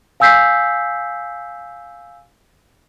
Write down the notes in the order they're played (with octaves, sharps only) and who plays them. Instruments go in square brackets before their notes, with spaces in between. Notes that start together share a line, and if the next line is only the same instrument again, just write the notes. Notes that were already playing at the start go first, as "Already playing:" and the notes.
[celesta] F5 G#5 E6 G6 B6 C7